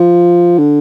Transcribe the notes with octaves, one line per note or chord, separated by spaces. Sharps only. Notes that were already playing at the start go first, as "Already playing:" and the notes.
Already playing: F3
D3